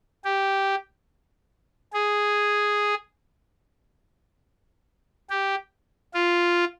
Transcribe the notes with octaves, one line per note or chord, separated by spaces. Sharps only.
G4
G#4
G4
F4